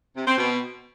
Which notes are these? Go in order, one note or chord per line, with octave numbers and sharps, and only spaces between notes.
C3
C4
B2